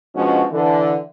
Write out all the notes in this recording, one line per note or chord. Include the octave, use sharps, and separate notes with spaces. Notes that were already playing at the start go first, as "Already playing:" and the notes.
B2 F3 G#3 C#4 D4 F#4
D3 E3